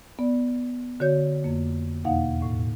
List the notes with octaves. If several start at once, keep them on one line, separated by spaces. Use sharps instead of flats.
B3 D5
D3 F#4 C#5 G6
F2 A#3
E2 B2 A#3 D#4 F5 F#5
A2